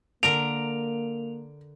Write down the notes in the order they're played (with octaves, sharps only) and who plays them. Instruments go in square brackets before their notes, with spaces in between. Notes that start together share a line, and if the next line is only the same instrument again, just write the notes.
[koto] D3 A#4 A#5 [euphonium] A#3 [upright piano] D7 [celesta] F7